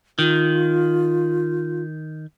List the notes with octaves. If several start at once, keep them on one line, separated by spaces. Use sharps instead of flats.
D#3 F4